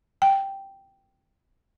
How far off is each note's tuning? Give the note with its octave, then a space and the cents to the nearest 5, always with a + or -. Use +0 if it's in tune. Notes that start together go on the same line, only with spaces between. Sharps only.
G5 -5